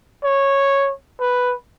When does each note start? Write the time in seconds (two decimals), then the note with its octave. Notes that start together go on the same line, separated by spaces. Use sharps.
0.24 C#5
1.20 B4